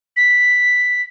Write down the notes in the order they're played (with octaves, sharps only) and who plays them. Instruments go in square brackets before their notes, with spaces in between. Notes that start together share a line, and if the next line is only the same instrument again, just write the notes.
[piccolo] B6